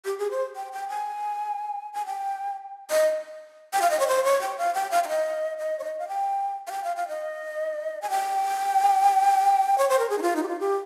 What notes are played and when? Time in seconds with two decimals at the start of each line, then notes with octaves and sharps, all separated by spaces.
0.05 G4
0.18 G#4
0.31 C5
0.56 G5
0.73 G5
0.89 G#5
1.93 G#5
2.06 G5
2.91 D#5
3.73 G5
3.82 F5
3.91 D#5
4.00 C#5
4.08 C5
4.25 C#5
4.41 G5
4.58 F5
4.74 G5
4.91 F5
5.04 F5
5.08 D#5
5.58 D#5
5.79 C#5
5.84 D#5
5.99 F5
6.08 G5
6.67 F5
6.71 G5
6.84 F5
6.96 F5
7.08 D#5
8.02 G#5
8.10 G5
9.78 C#5
9.89 C5
9.99 A#4
10.10 G#4
10.18 D#4
10.22 F4
10.36 D#4
10.43 G4
10.48 F4
10.60 G4